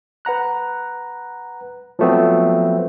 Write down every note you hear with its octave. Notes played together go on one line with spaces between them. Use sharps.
B4 F#5 A#5 F#6
F3 F#3 A3 B3 C4